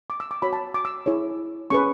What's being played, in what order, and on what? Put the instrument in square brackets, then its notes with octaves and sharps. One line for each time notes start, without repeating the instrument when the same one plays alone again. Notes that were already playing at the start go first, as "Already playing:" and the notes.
[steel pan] D6
E6
D6
F#4 C#5 B5
A5
D6
E6
E4 G#4 C#5
C#4 G#4 B4 C#6